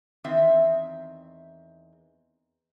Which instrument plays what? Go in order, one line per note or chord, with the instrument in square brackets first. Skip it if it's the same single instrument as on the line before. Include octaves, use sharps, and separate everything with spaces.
[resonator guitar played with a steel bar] E2 D#3 C4 E5